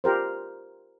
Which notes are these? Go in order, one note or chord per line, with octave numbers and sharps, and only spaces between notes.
F4 G4 A#4 C5